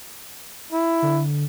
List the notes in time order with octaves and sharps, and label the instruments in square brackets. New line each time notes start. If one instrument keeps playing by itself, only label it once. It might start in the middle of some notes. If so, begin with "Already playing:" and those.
[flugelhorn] E4
[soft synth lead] D3